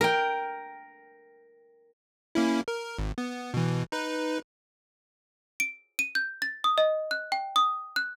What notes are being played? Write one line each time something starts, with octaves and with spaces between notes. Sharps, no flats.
A#4 G5
A#3 C#4 E4
A#4
G#1
B3
B2 E3
D#4 B4
D7
D#7
G6
A6
D#6
D#5
F#6
G5
D#6
F#6